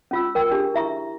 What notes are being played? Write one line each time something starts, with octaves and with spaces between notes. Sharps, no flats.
C#4 F4 E6
A#4 G5 E6
D4 G4 G#4
E4 E5 A#5 C#6